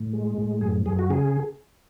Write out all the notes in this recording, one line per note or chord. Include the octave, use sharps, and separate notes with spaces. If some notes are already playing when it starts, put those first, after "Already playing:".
Already playing: A2
G#3
A2
F#2 G#4
F#2 G#4
F#4
C#3 G#4